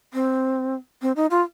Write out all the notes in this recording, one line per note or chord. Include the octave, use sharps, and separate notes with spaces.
C4
C4
D#4
F4